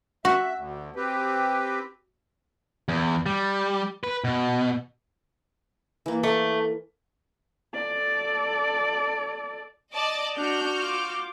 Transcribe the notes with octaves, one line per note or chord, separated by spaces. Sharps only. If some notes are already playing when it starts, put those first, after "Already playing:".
F#4 E5
D2
C4 G4 B4
E2
G3
B4
B2
E3 A#3
A3
A4 D5
D5 D#5 A5
D4 F#4 F6 G6
F4 D6